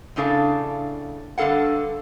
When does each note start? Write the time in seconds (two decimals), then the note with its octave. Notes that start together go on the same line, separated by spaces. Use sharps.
0.16 A2 C#3 D4 A4 F5
1.38 G2 D3 D4 A4 F5 F#5